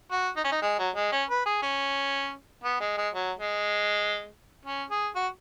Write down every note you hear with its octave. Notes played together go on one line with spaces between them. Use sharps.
F#4
D#4
C#4
D#4
G#3
F#3
G#3
C#4
B4
G#4
C#4
B3
G#3
G#3
F#3
G#3
C#4
G#4
F#4